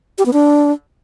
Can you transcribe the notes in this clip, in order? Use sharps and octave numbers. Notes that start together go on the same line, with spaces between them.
G4
B3
D4